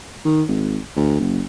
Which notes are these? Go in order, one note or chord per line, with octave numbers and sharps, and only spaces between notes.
D#3
G#1
D2
F#1